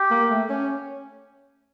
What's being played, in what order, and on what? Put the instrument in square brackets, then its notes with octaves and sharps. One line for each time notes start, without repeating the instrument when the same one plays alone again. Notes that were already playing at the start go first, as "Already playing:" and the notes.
Already playing: [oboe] G4
[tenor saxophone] A#3
A3
C#4